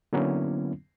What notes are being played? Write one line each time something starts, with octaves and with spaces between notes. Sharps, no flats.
D3 F#3 A#3 B3 C#4 E4